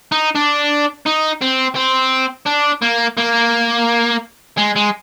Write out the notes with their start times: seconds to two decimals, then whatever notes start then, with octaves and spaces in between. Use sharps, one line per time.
0.12 D#4
0.35 D4
1.06 D#4
1.42 C4
1.76 C4
2.46 D4
2.82 A#3
3.18 A#3
4.58 G#3
4.76 G#3